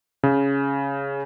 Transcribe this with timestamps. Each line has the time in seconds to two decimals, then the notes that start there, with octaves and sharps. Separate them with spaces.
0.23 C#3